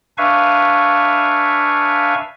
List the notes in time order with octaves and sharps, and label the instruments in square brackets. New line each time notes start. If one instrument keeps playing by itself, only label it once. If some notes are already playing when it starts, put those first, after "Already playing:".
[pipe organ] D4 B4 E5 F5 G#5 C#6